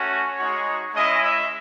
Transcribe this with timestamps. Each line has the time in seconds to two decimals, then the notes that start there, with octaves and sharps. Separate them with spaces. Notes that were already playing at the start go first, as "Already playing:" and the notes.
Already playing: A3 C#4 F#4
0.10 C#5
0.37 G#3 D#4 F#4
0.94 G#3 C#4 E4 D#5
1.22 E5